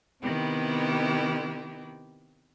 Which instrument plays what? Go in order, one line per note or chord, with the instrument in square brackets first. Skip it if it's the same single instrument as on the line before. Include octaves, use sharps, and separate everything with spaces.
[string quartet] C3 D#3 B3 E4 G4